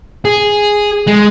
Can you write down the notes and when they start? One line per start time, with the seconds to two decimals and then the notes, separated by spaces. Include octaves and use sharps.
0.25 G#4
1.08 G#3